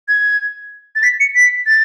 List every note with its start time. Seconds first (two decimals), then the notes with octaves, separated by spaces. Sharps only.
0.09 G#6
0.96 A6
1.03 B6
1.20 C#7
1.35 B6
1.66 A6